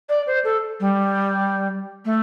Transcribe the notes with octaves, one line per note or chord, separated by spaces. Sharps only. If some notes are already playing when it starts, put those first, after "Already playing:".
D5
C5
A4
G3
A3